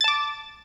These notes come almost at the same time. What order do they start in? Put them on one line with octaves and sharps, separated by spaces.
A6 A5 D6